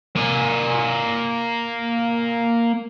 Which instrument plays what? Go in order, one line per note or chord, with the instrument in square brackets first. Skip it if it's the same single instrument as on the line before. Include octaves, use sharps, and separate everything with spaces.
[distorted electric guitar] A#3 G#5